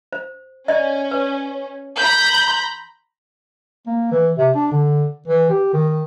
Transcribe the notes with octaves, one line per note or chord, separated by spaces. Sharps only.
C5
C#4 D5 D#5
B4
A#5 B5 G6
C6
A#3
E3
C3
D4
D3
E3
G4
D#3